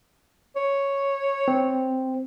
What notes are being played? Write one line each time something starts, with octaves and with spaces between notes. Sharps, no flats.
C#5
C4